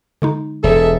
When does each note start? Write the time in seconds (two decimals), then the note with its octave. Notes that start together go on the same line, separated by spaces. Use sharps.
0.22 D3 G#3 D#4
0.64 E1 G#4 A4 E5